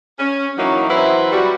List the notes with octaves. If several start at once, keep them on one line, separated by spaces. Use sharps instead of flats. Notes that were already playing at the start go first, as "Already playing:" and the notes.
C#4
E3 F#3 A#3 C#4 D#4 E4
E3 F#3 C4 E4 B4 C5
G3 F#4